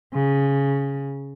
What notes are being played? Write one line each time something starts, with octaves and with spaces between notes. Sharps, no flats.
C#3